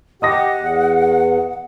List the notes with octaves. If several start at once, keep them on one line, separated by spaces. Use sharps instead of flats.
G4 D#5 F#5 D#6 A#6
E2